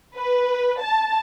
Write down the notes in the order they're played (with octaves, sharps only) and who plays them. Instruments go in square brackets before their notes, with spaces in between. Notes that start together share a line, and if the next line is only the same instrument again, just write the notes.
[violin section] B4
A5